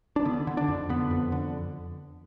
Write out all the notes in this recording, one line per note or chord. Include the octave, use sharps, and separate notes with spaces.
D4
D3 B3
D3
D4
F2
D3 B3
F2
D3